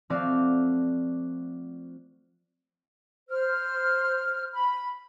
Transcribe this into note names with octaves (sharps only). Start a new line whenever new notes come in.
F3 A3 C4 F#4 D5 F5
C5 F6
B5